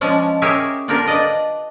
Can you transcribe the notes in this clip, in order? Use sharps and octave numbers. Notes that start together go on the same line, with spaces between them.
F3 G#3 C#4 D4
C#4 G4 G#4 A#4 C#5 E5
D3 D4 F4 G4 A#4
D4 B4 D5 D#5